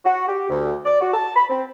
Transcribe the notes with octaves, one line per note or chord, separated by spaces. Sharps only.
F#4
G4
D2
D5
F#4
A5
B5
C4